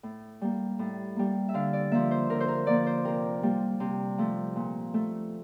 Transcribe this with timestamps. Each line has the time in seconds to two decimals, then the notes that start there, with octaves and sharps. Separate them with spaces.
0.03 A2
0.41 G3 A#3
0.79 A2
1.16 G3 A#3
1.49 E5
1.54 D3 F5
1.73 D5
1.92 F3 A#3 E5
2.11 C5
2.30 D3 A#4
2.40 C5
2.48 A#4
2.67 F3 A#3 D5
2.86 C5
3.05 C3 A#4
3.43 G3 A#3
3.80 C3
4.18 F3 A3
4.56 A#2
4.94 A3